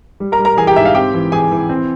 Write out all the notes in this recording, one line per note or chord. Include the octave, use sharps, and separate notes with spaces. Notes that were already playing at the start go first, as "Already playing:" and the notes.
G3
A#4 A#5
G3
A#4 A#5
E3 G#4 G#5
G4 G5
G#2 E5
F5
C4 G4 G5
E3
E3 G#4 G#5
E3
C4